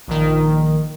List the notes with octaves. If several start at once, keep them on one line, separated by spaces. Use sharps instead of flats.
A#1 D#3